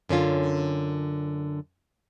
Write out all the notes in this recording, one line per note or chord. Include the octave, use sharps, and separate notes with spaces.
F#2 D3 C#4 F4